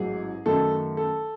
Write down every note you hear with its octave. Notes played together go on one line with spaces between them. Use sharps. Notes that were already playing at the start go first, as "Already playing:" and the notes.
Already playing: A1 G#2 F#3 G#4
F#2 D#3 A3 A4
A4